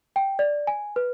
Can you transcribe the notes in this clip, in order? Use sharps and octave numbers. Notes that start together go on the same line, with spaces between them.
G5
D5
G#5
B4